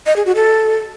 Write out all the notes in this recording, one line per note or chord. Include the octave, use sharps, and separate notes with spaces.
D#5
G#4
F#4
A4